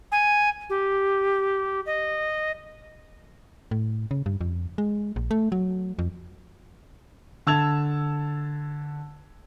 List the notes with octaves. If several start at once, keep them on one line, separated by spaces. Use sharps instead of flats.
G#5
G4
D#5
A2
C#3
G2
F2
G#3
A#1
A3
F#3
F2
D3 A5 E6 G#6 F7